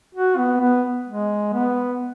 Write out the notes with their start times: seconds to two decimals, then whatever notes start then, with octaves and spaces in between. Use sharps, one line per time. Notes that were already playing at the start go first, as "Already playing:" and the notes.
0.15 F#4
0.38 B3
0.61 B3
1.07 G#3
1.53 B3